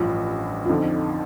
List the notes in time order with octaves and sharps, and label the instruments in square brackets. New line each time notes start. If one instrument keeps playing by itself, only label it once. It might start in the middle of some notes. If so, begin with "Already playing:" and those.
Already playing: [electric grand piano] A1 G2 F3 [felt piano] F4
[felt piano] F4
[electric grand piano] F2 D3 F3 [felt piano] D#4